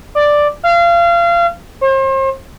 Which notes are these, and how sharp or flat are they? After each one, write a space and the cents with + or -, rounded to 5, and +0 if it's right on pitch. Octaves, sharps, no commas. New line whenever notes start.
D5 +5
F5 -30
C5 +40